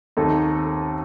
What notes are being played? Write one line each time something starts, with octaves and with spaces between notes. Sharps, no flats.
D#2 D#3 A3 C4 D#4 A4